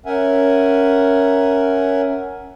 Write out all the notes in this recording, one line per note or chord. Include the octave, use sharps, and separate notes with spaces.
C#4 A#4 E5 F#5 G#5